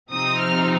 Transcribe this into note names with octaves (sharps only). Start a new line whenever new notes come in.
C3 F3 C4 D#4 D#6
F6